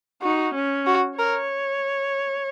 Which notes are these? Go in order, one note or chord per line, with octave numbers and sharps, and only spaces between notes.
D#4 F#4
C#4
F#4
A#4 C#5